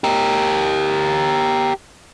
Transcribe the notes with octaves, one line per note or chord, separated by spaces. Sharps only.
G4 A#4